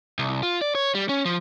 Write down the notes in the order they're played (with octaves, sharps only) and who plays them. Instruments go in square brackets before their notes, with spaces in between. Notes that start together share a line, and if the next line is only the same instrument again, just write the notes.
[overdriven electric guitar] C2
F4
D5
C#5
G3
C#4
F3